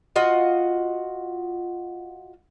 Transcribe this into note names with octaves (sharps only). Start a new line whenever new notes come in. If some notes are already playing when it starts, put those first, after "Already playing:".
F4 F#4 D#5